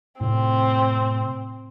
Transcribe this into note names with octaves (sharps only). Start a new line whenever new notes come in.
A2 C3 C4